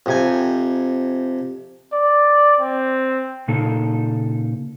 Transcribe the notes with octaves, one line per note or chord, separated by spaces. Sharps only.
F2 C3 G#5
D5
C4
A#2 C#3 A#3 D#4 A4